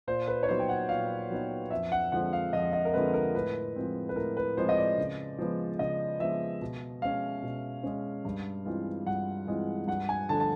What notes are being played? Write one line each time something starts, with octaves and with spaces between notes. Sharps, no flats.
A#2 C5
B4
C#5
F#3 B3 D#4 C5
G5
F#5
A#2 F5
F#3 B3 D#4
F2 E5
F#5
D3 F3 G#3 C4 F#5
F5
F2 D#5
D#5
A#4
D3 F3 G#3 C4 B4
A#4
A2 B4
F3 G#3 C4
B4
A2 A#4
B4
F3 G#3 C4 C5
D#5
D5
C#3
F3 G#3 B3
C#3 D#5
F3 G#3 B3 E5
B2
G#3 C#4 F5
B2
G#3 C#4
G2
E3 G#3 C4 F4
G2 F#5
E3 G#3 C4 F4
G2 F#5
G#5
D3 F3 A3 A5
A5